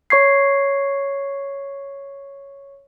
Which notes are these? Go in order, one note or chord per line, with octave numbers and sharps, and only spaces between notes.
C#5 C#6 G#6 C7